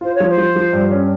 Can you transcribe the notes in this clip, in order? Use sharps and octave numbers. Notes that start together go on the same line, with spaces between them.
F4 C5
C#5
F3
C5
F3
F3
G2
C#4